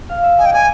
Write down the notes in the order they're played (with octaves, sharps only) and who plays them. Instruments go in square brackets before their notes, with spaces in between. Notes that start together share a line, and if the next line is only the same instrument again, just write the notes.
[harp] F5
E5
[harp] D#5 [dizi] G#5
[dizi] G5
[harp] D5 [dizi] G#5